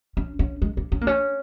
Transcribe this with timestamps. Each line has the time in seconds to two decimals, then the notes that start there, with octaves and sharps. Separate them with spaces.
0.17 C#4
0.39 C#4
0.62 G#3
0.77 A#3
0.92 C#4
1.01 A#3
1.07 C#4